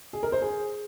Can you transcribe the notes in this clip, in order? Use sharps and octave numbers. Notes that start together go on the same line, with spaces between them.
G#4
A#4
C5
G#4